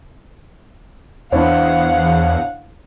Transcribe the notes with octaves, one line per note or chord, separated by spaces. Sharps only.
E2 D4 E4 C5 C#5 F5 F#5